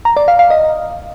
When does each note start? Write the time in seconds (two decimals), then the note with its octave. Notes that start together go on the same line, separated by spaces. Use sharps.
0.05 A#5
0.17 D5
0.28 F5
0.39 F5
0.50 D#5